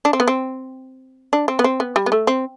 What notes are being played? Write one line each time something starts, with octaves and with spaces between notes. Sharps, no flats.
D4
C4
B3
C4
D4
C4
B3
C4
B3
G3
B3
A3
C4